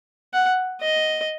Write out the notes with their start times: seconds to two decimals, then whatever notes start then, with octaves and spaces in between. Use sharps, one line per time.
0.34 F#5
0.82 D#5